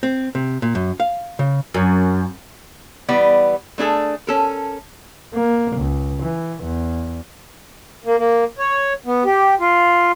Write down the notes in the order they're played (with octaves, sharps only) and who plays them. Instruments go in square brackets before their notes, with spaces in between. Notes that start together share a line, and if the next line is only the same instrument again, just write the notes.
[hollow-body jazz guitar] C4
C3
A#2
F#2
F5
C#3
[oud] F#2
[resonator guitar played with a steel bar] E3 G3 B3 D5
A3 D4 G#4 A4
C#4 A4 A#4
[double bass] A#3
C#2
E3
E2
[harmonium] A#3
A#3
C#5
B3
G4
F4